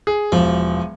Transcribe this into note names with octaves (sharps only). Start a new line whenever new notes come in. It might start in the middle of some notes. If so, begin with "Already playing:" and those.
G#4
E1 F3